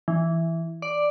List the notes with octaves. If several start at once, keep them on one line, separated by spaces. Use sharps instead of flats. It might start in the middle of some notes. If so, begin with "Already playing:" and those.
E3
D5